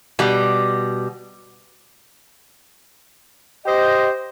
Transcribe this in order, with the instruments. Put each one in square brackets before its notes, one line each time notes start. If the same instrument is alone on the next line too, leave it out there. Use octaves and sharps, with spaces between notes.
[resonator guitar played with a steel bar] B2 G3
[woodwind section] G4 C5 D#5